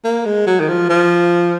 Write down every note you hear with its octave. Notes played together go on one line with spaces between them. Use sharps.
A#3
G#3
F#3
D#3
F3
F3